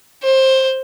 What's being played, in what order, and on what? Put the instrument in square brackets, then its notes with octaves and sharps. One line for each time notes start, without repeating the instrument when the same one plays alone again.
[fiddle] C5